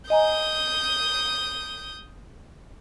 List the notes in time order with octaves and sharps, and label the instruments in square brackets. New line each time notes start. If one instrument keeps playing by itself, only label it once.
[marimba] D#5 G#5 A#5 [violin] D#6 G6